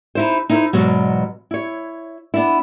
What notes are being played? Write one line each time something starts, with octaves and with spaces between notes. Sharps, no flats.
D#4 E4 C5
D#4 E4 A4 A#4 C5
E2 G#2 B2 F#3
E4 C#5
B3 D4 E4